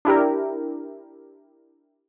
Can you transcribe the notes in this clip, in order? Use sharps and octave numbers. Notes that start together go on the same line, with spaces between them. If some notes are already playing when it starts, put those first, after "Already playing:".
D4 E4 G4 A#4